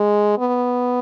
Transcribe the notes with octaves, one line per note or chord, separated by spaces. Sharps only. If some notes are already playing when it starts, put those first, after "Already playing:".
Already playing: G#3
B3